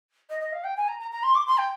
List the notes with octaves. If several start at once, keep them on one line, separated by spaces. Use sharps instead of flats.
D#5
D#5
F5
G5
G#5
A#5
A#5
A#5
C6
D6
C6
G5